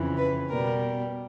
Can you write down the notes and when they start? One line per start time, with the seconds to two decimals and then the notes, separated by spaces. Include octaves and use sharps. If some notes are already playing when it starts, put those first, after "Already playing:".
Already playing: F2 C#3 E3
0.17 B4
0.49 B2 G3 A#4